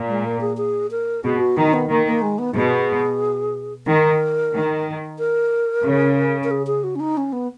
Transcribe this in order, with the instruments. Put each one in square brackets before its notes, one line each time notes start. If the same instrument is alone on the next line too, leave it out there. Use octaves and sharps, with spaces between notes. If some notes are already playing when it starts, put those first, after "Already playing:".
Already playing: [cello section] A#2
[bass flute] G#3
A#3
G#4
G#4
A#4
[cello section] B2 [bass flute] G#4
[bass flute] F#4
[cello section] D#3 [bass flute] D#4
[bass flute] B3
[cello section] D#3 [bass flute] A#3
[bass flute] A#3
G#3
B3
[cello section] B2 [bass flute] G#4
[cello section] D#3 [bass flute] A#4
[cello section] D#3
[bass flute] A#4
[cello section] C#3
[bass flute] A#4
G#4
G#4
F#4
C#4
D#4
C#4
B3